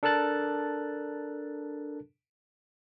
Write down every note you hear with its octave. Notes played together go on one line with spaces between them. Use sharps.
D4 A4 A#4 A5 F#6 A6